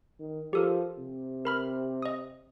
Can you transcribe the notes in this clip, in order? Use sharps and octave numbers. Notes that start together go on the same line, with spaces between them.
D#3
F3 G4 A4 A#4
C3
A#4 B5 F6
D#5 D#6